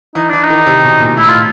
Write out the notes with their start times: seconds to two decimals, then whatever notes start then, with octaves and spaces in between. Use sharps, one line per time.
0.15 E3 D#4
0.29 E3 D4
0.43 D#4
0.50 D#3
0.66 C3
0.84 B2
1.00 A#2
1.17 A2 E4
1.28 F4